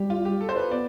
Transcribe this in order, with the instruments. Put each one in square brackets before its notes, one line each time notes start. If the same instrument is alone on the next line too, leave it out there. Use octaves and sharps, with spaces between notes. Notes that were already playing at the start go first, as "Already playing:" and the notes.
Already playing: [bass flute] G3 [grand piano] G4
[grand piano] F4
G4
A4
C5
B4
[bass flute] B3 [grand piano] D5